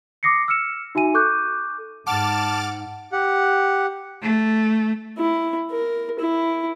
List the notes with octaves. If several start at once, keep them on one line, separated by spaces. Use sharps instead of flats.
D6 D#6 A#6 C7 C#7
E6 F6 C#7 E7
D#4 F#4 E5 G#5 D#7
A4 C#6 D6 F#6 G6
G#2 F#5 A5 D6 F6 A6
G4 F#5
A3
E4
A#4
E4